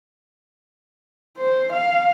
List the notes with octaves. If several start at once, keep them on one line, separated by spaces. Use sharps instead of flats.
C5
F5